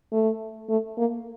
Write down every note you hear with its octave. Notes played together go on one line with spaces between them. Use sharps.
A3
A3
A#3